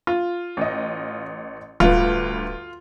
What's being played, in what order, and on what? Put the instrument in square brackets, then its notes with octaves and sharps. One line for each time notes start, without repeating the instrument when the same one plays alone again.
[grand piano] F4
[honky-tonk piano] A1 D#5
[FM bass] D1 [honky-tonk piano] D2 G2 B4 [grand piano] F4